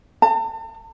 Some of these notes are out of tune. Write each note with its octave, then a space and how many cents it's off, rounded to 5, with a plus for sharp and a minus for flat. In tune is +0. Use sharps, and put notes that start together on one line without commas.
A5 +45